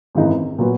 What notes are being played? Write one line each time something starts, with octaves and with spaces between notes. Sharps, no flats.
G#1 F#2 E3 G#3 D#4
A#2 F#3 B3 F#4 B4